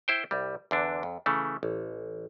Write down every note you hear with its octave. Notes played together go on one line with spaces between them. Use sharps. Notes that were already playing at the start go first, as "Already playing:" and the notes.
E4 C5 G5
C2 G3
E2 D3 D4
F2
C#3 E3 A3
A1